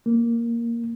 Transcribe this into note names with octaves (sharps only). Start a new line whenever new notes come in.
A#3